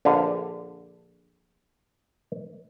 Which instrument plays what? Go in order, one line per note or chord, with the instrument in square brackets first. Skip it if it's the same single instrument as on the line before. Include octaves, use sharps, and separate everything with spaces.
[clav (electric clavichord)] A#1 D3 B4 F5